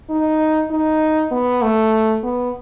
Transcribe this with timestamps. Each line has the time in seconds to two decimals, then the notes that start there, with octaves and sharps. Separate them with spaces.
0.10 D#4
0.71 D#4
1.31 B3
1.62 A3
2.23 B3